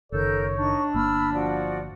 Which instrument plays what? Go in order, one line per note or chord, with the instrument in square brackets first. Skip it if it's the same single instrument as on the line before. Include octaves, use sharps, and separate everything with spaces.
[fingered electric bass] F#1 D#3 [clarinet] A4 [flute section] A#4 G6 [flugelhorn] C#5
[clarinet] D4 [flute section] D#4 C#6
[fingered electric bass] G1 A#3 [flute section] B5 E6 F6
[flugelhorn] F3 [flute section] F#4 D5